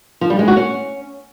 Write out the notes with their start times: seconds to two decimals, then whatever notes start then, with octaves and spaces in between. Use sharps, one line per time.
0.21 F3
0.30 G3
0.39 G#3
0.48 F#4
0.57 C#4